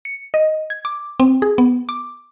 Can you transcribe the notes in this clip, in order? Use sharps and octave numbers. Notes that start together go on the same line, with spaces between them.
C#7
D#5
G#6
D6
C4
G#4
B3
D6